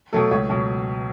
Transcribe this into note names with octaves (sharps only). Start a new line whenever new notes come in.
B2 F#3 A3 A4
C#2 C#5
B2 F#3